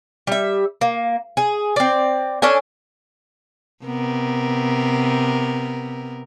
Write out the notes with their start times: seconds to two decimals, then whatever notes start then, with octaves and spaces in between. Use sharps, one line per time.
0.27 G3 E5
0.81 A#3
1.37 G#4
1.76 C4 D5
2.42 C#4 D4 A4 G#5
3.85 C3 B3 A#4